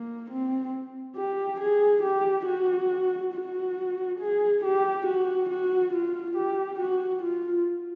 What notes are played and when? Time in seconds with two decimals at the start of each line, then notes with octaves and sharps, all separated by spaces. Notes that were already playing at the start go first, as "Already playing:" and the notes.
Already playing: A#3
0.31 C4
1.16 G4
1.60 G#4
2.03 G4
2.46 F#4
3.34 F#4
4.20 G#4
4.64 G4
5.06 F#4
5.50 F#4
5.94 F4
6.37 G4
6.80 F#4
7.23 F4